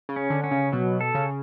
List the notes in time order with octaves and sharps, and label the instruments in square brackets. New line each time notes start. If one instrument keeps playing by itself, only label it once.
[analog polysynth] C#3
[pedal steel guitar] C#4
[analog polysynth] D3
[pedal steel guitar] C#4
[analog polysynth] C#3
[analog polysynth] B2 [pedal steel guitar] F#3
[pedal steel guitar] A4
[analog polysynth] C#3